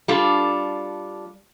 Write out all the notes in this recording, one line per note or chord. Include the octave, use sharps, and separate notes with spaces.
G3 D4 F4 A4